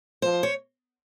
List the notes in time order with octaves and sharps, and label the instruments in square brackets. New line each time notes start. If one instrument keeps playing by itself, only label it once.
[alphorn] F3 [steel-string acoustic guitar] C5
[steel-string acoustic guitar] C#5